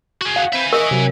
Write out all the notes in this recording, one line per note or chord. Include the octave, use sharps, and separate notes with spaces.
F#4 G#4
F5 F#5
C4 E5 G#5 B5 G6
A#4 D#5 C#6
C3 F#3